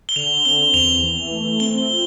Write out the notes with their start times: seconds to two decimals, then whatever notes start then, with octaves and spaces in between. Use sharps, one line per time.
0.09 G7
0.16 D3 F7
0.45 C4 G7
0.73 E2 F7
1.03 E3
1.31 A3
1.60 C4 G7
1.90 F4